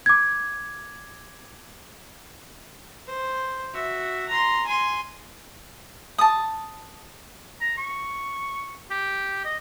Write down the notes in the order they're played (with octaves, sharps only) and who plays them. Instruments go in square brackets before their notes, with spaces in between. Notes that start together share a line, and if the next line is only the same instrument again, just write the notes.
[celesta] D6 G#6
[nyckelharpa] C5
F#4 E5
A#5 C6
G#5 C6
[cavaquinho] A5 D#6
[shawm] A#5
C#6
G4
D#5